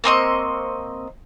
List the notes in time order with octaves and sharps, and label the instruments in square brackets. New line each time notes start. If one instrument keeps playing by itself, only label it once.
[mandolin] A#3 C4 D#5 C#6